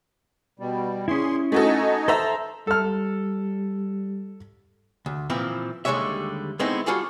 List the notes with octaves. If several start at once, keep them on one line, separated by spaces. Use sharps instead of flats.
B2 G3
C#4 E4 G#4 C6
A3 D#4 F#4 A4 D#5 G#5
A4 C5 E5 A#5
G3 A4 F6
D2
A#2 E3 F3 C4 E4
D#2 D3 G3 G#3 C#5 E5
G#3 A3 B3 C4 D#4 E4
G3 F4 F#4 G#4 A4